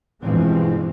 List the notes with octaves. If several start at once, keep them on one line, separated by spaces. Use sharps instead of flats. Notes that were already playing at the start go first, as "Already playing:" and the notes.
G2 B2 E3 F3 G#3 C4